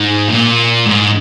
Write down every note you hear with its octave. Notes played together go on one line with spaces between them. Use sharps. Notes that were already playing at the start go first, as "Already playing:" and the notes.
Already playing: G#2
A#2
G#2